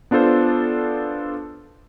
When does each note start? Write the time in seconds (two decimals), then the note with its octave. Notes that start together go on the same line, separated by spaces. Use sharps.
0.11 B3 D4 F4 A4 C5